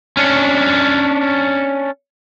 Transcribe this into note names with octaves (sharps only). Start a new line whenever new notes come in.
C#4 D4